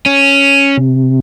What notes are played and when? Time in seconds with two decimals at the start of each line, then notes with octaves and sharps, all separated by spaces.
0.06 C#4
0.77 C3